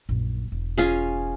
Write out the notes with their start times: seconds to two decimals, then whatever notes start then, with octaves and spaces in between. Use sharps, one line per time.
0.09 A#1 F#2
0.52 E1
0.78 C#4 F4 G#4